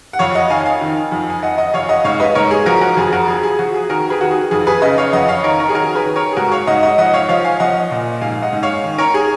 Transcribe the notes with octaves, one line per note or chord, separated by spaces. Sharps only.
F#5
F2 C#5 F5
D#5 F#5
D#3 F5 G#5
F5 G#5
D#3
F2
G#5
F2 D#5 F#5
D#5 F#5
F2 C#5 F5
D#5 F#5
G#2 C#5 F5
B4 D#5
G#2 A#4 C#5
G#4
F3 F#4 A#4
F#4 A#4
F2 G#4
F#4 A#4
F3 G#4
G#4
F3 F#4
G#4
D#3 F#4 A#4
G#4 B4
D#3 F#4
G#4
F2 G#4
G#4 B4
C#3 B4 D#5
C#5 F5
F2 D#5 F#5
C#5 F5
D#3 A#4 C#5
A#4 C#5
G#4
D#3 F#4 A#4
G#4 B4
D#3
A#4 C#5
G#4
G#2 F#4 A#4
C#5 F5
G#2 D#5 F#5
D#5 F#5
F3 D#5 F#5
C#5 F5
F3 C#5 F5
F5 G#5
F3 D#5 F#5
A#2
G#2 F5 G#5
D#5 F#5
G#2
C#5 F5
D#3
A#4 C#5
G#4